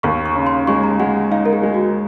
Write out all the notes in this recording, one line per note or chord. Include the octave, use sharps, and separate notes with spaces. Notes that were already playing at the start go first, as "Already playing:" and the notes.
D#2 C#6
C#6
C#3
C6
G#3 C#6
A#5
G#3 F#5
D#4 F5
A#4
G#4
G#3
F#4